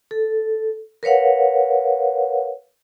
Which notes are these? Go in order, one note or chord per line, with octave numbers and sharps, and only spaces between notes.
A4
A#4 B4 C#5 F5 F#5